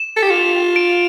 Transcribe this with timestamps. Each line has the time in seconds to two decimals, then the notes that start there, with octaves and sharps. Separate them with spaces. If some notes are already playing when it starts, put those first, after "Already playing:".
Already playing: E7
0.17 A4
0.23 G4
0.31 F4
0.76 D7